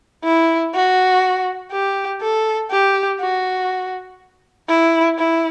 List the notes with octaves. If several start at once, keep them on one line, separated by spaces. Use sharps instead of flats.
E4
F#4
G4
A4
G4
F#4
E4
E4